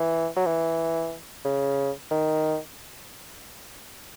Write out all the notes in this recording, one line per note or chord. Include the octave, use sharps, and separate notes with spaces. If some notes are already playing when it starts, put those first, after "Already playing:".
Already playing: E3
F#3
E3
C#3
D#3